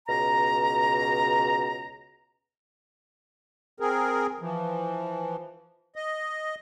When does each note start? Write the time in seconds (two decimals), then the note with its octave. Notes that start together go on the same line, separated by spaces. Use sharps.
0.08 C#2 B2 A#5
3.80 C4 G#4 A#4
4.40 E3 F3
5.96 D#5